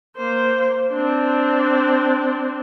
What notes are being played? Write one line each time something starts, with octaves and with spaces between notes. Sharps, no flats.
A#3 C5
C4 D4